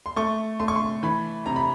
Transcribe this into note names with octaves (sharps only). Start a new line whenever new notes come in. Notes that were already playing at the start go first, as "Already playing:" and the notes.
C6
A3 C#6
A3 C6
C#6
C6
E3 B5
C3 A#5
B5